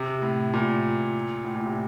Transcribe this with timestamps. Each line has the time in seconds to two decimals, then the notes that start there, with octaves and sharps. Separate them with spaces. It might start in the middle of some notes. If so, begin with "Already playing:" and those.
Already playing: C3
0.22 A2
0.54 A#2
1.45 A2
1.55 A#2
1.66 C3